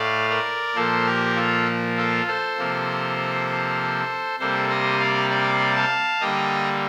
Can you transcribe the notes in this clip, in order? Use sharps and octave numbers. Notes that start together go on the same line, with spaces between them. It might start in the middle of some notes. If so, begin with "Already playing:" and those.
Already playing: A2 A3 D5 F5
A#4 D5
A#2 F3 A#3 A4 C5
G4 A#4
F4 A4
F4 A4
A4 C5
C3 F3 A#3
C3 G3 A#3 A4 C5
C5 D#5
D5 F5
D5 F5
F5 A5
D3 G3 A#3 D#5 G5